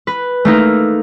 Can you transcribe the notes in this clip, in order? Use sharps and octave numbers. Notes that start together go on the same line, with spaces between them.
B4
A3 A#3 D#4